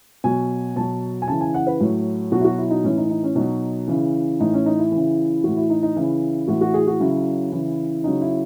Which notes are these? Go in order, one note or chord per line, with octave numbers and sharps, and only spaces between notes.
B2 F#3 G#5
B2 F#3 A5
G#5
C#3 E3 A5
G#5
F#5
B4
A2 F#3
B2 F#3 F#4
E4
F#4
E4
D#4
A2 E3 C#4
D#4
D#4
C#4
B2 F#3 D#4
C#3 E3
A2 E3 D#4
C#4
D#4
E4
C#3 E3
A2 E3 F#4
E4
D#4
D#4
C#3 E3 E4
A2 E3 F#4
F#4
G#4
F#4
C#3 F#3 E4
C#3 E3
C#3 F#3 D#4
E4